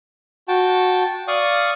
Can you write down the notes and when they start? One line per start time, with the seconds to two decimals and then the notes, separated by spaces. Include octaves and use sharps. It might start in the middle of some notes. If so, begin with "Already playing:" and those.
0.48 F#4 G5 A5
1.28 D5 F5 C#6 D#6